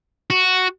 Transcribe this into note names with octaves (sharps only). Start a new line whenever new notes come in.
F#4